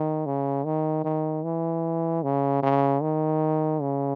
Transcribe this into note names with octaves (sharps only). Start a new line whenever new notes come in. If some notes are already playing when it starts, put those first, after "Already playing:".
Already playing: D#3
C#3
D#3
D#3
E3
C#3
C#3
D#3
C#3